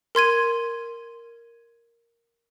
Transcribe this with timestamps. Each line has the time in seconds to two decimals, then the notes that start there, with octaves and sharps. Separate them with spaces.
0.15 A#4 C6 G#6 D#7